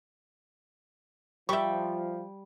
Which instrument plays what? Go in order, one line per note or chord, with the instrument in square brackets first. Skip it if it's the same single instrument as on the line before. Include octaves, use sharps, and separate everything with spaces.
[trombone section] F3 [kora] G3 G5 [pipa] E5 C#6